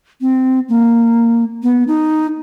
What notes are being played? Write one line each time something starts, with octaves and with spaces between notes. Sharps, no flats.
C4
A#3
B3
D#4